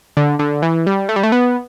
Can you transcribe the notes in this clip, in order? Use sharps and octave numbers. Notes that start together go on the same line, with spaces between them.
D3
D3
E3
G3
A3
G3
A3
B3